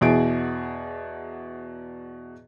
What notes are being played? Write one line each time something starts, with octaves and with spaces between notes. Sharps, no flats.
E2 B2 E4 G#4 D7